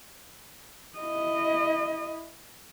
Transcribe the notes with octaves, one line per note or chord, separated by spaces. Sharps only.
E4 D#5